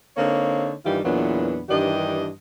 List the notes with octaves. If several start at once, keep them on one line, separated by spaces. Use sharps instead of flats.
D3 A#3 C4 D#4 C#5
G2 D#3 E3 G3 F4 G4
E2 A#2 E3 F#3 B3 D4
G2 D#3 E3 D4 G4 D#5